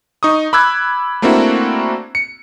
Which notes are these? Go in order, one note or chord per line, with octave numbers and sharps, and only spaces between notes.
D#4 C#6 D#6
B5 D6 E6 F#6 G#6
A3 A#3 C4 D4 E4 F#4
C#7